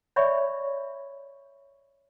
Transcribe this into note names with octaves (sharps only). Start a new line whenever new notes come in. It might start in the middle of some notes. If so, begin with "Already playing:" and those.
C#5 D5 E5 B5 C#6